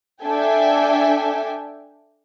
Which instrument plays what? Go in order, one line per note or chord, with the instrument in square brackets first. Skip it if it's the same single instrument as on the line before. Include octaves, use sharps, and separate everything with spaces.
[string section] D4 A4 E5 G5 G#5